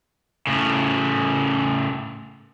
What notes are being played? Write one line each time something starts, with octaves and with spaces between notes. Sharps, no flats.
A2 C#3